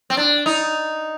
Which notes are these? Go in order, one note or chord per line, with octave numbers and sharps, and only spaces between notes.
C4
D4
D#4